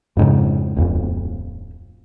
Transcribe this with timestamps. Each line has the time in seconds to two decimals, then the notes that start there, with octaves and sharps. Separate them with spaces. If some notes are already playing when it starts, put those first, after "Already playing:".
0.17 F2 G#2 C#3
0.77 D1 F2